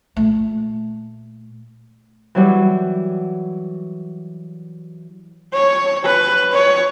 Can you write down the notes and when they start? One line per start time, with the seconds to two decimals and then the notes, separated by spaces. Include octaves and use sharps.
0.17 A#2 A3
2.35 E3 F#3 G3
5.54 C#5
6.05 B4
6.53 C#5